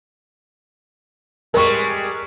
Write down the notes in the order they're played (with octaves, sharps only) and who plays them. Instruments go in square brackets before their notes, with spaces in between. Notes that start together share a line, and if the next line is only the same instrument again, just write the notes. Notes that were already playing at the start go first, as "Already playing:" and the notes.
[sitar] G3 G#3 [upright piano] A#4 C#6